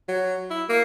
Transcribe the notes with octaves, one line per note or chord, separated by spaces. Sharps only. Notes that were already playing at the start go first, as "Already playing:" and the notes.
F#3
E4
A#3